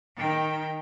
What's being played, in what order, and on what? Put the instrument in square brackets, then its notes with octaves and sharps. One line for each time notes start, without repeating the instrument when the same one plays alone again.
[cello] D#3 G5